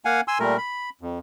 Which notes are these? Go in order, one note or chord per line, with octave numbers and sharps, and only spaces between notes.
A#3 F5 F#5 G#5
G#5 C6 E6
A#2 G3 A3 A#4
B5
F2